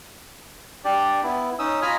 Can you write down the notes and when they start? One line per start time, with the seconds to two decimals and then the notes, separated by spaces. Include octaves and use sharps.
0.85 D4 G4 D5
1.23 B3 E4
1.59 C#4 D#4 D#6 E6
1.82 F4 D#5 G#5 A#5 B5 F6